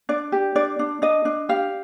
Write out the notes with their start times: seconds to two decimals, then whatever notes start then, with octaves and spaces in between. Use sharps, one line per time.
0.09 D4 D5
0.32 G4
0.55 D4 D5
0.79 D4
1.02 D4 D#5
1.25 D4
1.49 G4 F5